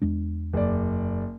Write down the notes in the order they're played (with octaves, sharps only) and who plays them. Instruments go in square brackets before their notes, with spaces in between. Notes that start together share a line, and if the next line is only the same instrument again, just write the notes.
[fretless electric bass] E2 G#3 D4
[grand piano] F#1 D5